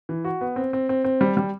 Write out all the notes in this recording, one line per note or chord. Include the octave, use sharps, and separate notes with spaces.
E3
F#4
B3
C4
C4
C4
C4
G3
G3